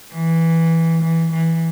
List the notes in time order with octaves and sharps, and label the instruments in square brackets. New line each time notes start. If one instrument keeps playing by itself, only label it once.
[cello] E3
E3
E3